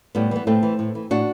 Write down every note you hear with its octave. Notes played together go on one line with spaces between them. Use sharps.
A2 G3 B3
E3 B3
A2 A3 C4
E3
A2
E3
A2 D4 F#4